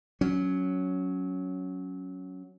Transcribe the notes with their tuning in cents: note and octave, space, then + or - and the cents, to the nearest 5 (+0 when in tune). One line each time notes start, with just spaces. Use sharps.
F#3 +0 C#4 +5